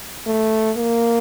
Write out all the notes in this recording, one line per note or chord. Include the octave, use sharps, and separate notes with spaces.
A3
A#3